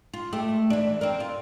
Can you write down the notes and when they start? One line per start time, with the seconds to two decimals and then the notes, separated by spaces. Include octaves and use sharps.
0.14 F4
0.33 A3 G4
0.70 E3 D4
1.01 C4 D4 A#4
1.20 F4